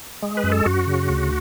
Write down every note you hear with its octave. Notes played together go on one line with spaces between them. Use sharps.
G#3
B4
F#2
A4
F#2 F#4
C#3
D2